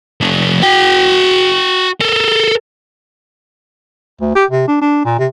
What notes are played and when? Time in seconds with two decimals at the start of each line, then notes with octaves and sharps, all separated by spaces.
0.21 F3 A3
0.63 F#4 G5
2.01 A4 A#4
4.21 D2
4.35 G4
4.51 C3
4.68 D4
4.81 D4
5.05 A#2
5.19 C3